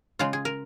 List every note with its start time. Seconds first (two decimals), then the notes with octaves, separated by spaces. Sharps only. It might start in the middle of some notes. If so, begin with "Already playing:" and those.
0.19 C#3 G#3 F4
0.33 G#4
0.45 A#4